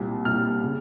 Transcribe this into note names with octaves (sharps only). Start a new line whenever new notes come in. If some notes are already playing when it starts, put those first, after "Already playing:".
Already playing: C2 A#2 G3
C2 A#2 G3 F6
C#3